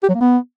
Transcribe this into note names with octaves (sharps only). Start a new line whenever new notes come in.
G4
F#3
A#3
B3